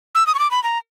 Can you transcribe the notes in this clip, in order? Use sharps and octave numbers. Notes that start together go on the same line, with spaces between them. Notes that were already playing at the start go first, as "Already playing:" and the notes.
E6
D#6
C#6
D6
B5
A#5